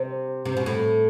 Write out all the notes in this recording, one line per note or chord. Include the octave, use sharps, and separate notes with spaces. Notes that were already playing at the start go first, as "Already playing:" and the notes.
Already playing: C3
C3
B2
A2